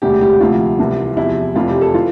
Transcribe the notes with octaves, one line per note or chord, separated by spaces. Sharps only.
E1 D2 C3 G4
G4
D2 C3 F3 F4
C2 C3 E3
E2 C3 F3 E4
F1 F2 C3 E3 F4
G4
A4
E3 F4